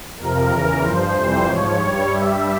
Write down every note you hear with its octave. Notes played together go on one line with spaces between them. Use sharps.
F2 C3 F3 A#4
E2 C#3 E3
G2 F3 C5
F2 C3 E3 G3
G#2 F3 C#5
G2 G3
G2 G3 E5